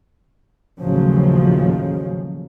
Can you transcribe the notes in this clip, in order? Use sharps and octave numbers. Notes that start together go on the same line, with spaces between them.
A1 D#2 A2 C#3 F3 F#3